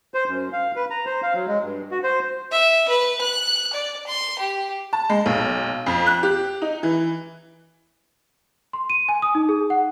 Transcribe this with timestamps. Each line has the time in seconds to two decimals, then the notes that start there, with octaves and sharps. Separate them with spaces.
0.14 C5
0.28 F#2
0.53 F5
0.76 B4
0.90 A#5
1.06 C5
1.23 F5
1.34 F#3
1.47 G#3
1.63 G2
1.91 F#4
2.03 C5
2.52 E5
2.89 B4
3.21 F#6
3.73 D5
4.07 C6
4.39 G4
4.93 A5
5.09 G#3
5.26 B1
5.86 F2
6.07 F#6
6.23 G4
6.62 D#4
6.83 E3
8.73 C6
8.90 D#7
9.09 G#5
9.22 D#6
9.35 D#4
9.49 G#4
9.70 F#5